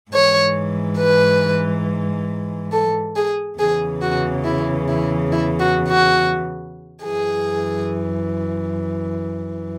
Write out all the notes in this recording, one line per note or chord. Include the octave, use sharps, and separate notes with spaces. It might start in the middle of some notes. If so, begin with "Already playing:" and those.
G#2 E3 C#5
B4
A4
G#4
E2 C#3 E3 G#4
F#4
E4
E4
E4
F#4
F#4
F#2 E3 G#4